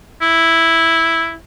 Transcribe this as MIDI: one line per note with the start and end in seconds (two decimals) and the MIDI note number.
0.22 1.34 64